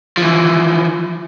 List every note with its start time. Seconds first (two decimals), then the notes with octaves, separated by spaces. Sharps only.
0.17 E3 F3